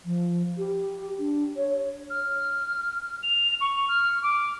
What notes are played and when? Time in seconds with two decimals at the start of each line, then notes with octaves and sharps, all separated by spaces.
0.05 F3
0.58 G4
1.19 D4
1.57 C#5
2.10 F6
3.23 F7
3.61 C#6
3.88 F6
4.22 D6